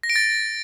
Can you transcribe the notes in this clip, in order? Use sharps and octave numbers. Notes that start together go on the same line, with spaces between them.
A#6
D7
A6